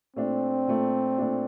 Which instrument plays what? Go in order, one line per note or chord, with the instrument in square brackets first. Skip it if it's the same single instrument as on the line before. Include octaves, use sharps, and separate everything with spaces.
[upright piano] A#2 A3 D4 [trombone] C4
[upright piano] A#2 A3 D4
A#2 A3 D4